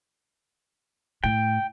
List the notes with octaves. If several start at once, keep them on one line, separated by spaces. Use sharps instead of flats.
A2 G5